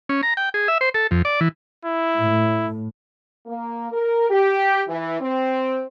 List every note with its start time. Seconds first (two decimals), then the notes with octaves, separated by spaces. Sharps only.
0.09 C#4
0.23 A#5
0.37 G5
0.54 G#4
0.68 E5
0.81 C5
0.94 A4
1.11 F2
1.25 D5
1.41 E3
1.85 E4
2.18 A2
3.46 A#3
3.92 A#4
4.30 G4
4.88 E3
5.20 C4